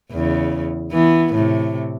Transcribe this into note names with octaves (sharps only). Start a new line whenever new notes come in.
E2 C#3
E3 B3
A2 C3